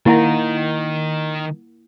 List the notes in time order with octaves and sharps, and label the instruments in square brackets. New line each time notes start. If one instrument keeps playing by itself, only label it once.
[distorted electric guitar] D#3 D#4 [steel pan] A#3 A#5 [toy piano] E4 F#5